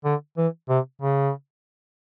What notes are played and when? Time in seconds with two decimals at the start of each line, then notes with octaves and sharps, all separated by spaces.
0.05 D3
0.37 E3
0.69 C3
1.01 C#3